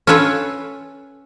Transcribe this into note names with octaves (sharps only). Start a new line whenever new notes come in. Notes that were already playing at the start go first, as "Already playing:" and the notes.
C#4 F4 A4 B4 C#5